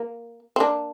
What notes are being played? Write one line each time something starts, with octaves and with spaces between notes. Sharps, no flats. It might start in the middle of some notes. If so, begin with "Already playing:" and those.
Already playing: A#3
C4
A#3 D4